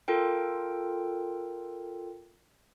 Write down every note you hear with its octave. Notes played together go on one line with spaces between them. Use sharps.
F4 A4 A#4 G5